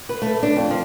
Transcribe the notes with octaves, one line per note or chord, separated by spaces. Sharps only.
B4
A3
D4
F2
F3